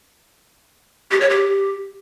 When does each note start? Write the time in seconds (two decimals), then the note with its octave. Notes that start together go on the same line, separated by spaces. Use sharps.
1.11 G4
1.21 C#5
1.30 G4